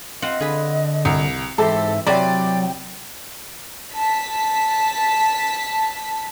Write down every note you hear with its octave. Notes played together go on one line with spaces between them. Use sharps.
C4 F4 D#5 F#5
D3 G#4 B4
C2
G#2 E3 C4 G4 A4 E5
C3 F#3 E4 F#4 D5 G5
A5 B6